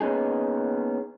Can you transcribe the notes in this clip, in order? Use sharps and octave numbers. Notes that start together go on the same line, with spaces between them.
A#3 B3 C#4 D#4 G#4